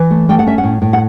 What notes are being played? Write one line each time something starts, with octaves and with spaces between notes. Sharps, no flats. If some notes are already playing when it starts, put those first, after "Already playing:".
Already playing: E3
A3
A3 G5
F#5
C#4 E5
F#5
A2
A2
F#5